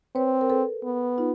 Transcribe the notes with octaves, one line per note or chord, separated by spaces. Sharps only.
C4 B4 C#5
A#4
A4 B4
B3
D#4 F4